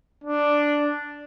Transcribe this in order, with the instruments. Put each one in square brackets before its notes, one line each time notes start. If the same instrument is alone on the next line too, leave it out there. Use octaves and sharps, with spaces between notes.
[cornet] D4